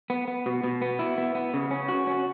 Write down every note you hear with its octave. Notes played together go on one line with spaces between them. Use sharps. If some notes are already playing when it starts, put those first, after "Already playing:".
B3
B3
B2
B2
B3
E4
B3
B3
C#3
C#4
F#4
C#4